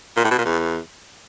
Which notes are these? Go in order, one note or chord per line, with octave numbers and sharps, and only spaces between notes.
A#2
A2
B2
A#2
E2